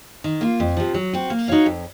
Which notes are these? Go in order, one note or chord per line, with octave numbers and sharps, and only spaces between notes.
D#3
A#3 F4
F2
C3 F3
F#3
C4 F#4
A#3
D#4 F#4 C#5 F5
F2